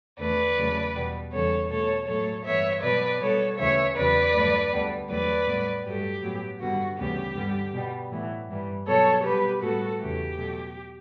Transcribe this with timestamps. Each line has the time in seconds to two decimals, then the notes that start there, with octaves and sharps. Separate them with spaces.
0.19 E2 D3 A3 B4 D5
0.56 E2 C#3 F#3 A3
0.94 E2 B2 G3 B3
1.32 E2 C#3 E3 G3 B3 A4 C#5
1.69 B2 A3 A4 C#5
2.07 A2 F#3 A3 A4 C#5
2.45 G2 E3 B3 C#5 E5
2.82 B2 F#3 B3 B4 D5
3.20 B2 G3 B3 A4 C#5
3.58 D2 C#3 E3 C#5 E5
3.96 E2 C#3 F#3 B4 D5
4.34 G2 D3 F#3 A3
4.72 D2 D3 G3 B3
5.09 E2 D3 F#3 A3 B4 D5
5.46 A2 G3 B3
5.85 G2 F#3 A3 G4
6.22 A2 F#3 B3
6.60 G2 D3 G3 B3 F#4
6.98 D2 C#3 E3 G3 B3 G4
7.35 G2 D3 G3 B3
7.73 B2 G3 B3
8.11 A2 E3 B3
8.48 G2 E3 G3
8.86 B2 F#3 B3 A4 C#5
9.24 B2 G3 B3 G4 B4
9.61 A2 G3 B3 F#4 A4
10.00 E2 C#3 E3 A3 G4
10.37 B2 F#3 A3